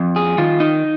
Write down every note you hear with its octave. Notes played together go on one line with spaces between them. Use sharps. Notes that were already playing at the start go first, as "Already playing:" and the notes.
Already playing: F2
G#4
D#3 F4
D#4